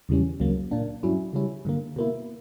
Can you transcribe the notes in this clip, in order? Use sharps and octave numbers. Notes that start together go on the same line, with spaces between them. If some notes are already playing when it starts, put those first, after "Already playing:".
E2 C#3 E3 G3 C#4
C#2 C#3 F#3 A#3
A#2 A#3 D4
G2 F#3 C#4 E4
C#3 G3 C#4 E4
G2 D3 A#3
B2 A#3 E4